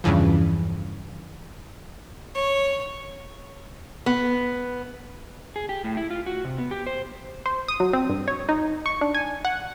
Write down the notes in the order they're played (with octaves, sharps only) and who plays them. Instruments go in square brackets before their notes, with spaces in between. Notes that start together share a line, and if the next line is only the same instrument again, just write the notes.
[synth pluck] E2 G2 C#3 E3 F3
[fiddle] C#5
[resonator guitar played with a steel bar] B3
[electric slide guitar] G#4
G4
A2
E4
F4
F#4
C3
B3
G4
C5
[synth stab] C5
D#6
F#3
C4
G2
C#5
D#4
C#6
D4
G#5
F#5